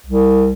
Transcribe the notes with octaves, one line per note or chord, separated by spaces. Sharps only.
C2